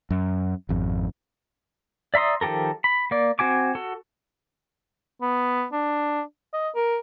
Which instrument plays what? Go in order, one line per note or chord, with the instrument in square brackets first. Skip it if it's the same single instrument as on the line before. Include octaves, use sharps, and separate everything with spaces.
[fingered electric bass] F#2
G#1 F2
[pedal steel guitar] D5 E5 A#5 C6 D#6
D#3 F3 G4 A4 A#4
B5
A#3 D5
C4 F#4 G#5 D6
F#4 A4
[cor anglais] B3
D4
D#5
A#4